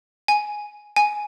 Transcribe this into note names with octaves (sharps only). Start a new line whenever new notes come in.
G#5
G#5